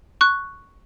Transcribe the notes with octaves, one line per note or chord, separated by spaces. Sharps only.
C#6 F#6